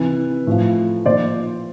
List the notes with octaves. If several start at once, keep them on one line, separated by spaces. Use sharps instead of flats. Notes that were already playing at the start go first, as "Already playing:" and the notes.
Already playing: C3 E3 B4
A2 F3
A#2 F3 C5 D5